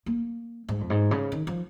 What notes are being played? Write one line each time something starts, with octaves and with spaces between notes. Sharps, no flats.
A#3
G#2
F2
G#2
C#3
D#3
F3